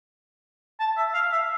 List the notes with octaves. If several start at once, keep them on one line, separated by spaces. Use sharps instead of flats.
A5
E5
F5
E5